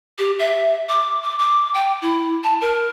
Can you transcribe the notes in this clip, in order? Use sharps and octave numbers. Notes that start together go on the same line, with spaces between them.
G4
E5
D6
D6
D6
G5
E4
A5
A#4